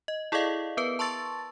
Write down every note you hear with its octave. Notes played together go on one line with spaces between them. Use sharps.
D#5
E4 G#4 A4 D5 D#5 F5
B3 A#4 B4
A5 C6 C#6 E6 A6